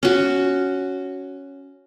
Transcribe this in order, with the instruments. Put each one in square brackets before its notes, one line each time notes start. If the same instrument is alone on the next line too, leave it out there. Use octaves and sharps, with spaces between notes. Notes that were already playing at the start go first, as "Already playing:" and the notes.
[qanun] C#4 F#4